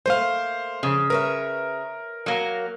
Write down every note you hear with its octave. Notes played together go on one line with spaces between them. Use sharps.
A3 A#3 C5 F5
F2 C#3
A#4 B4 C#5 E5
F#3 A#3